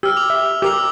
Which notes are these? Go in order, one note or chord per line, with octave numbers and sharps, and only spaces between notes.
G4 E6 F6
D6 F7
E5
G4 A#4 D6 E6 F7